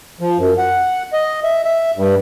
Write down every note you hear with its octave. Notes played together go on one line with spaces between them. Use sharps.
F3
F#2
F#5
D#5
E5
E5
G2